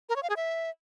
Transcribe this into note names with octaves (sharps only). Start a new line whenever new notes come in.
A#4
C#5
F5
G#4
E5